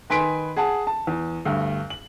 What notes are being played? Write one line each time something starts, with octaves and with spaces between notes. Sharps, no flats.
D#3 B4 G#5 C6 B6 D7
G#4 F#5 A5
A5
E2
D2 G2
F#7